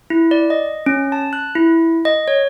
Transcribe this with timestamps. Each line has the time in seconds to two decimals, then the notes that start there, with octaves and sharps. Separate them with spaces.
0.10 E4
0.31 D5
0.50 D#5
0.86 C#4
1.12 A5
1.33 F#6
1.55 E4
2.05 D#5
2.28 C#5